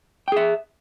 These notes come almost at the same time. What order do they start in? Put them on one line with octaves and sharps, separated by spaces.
G5 G#4 E5